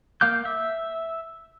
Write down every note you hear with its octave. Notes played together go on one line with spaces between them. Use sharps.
A#3 F5 D6 G6
E5